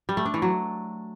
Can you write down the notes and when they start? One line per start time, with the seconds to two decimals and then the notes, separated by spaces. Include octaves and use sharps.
0.09 G3
0.17 A3
0.25 D4
0.34 E3
0.42 F#3